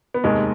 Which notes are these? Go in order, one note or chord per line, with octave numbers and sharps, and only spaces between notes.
B3
F1 D#2 D#3 G#3